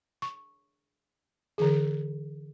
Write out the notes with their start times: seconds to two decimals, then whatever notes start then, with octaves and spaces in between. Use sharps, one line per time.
0.22 C#6
1.58 D3 E3 G#4